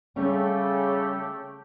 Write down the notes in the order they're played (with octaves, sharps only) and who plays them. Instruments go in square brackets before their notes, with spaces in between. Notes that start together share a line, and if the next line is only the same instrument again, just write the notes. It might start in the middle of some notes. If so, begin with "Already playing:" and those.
[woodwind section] C#3 [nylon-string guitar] G3 C#4 [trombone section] A3 G4 A4